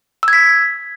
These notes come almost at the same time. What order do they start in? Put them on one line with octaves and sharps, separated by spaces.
E6 G#6 B6